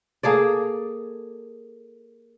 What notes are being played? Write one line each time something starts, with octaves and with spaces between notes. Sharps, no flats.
A#3 G#4 A4 D5